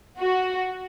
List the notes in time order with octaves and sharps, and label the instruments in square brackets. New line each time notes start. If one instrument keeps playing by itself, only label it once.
[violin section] F#4